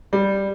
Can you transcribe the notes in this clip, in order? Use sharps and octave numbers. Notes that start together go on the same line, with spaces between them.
G3